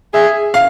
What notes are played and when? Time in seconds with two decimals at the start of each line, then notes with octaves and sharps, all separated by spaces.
0.13 G#4 E5
0.54 F5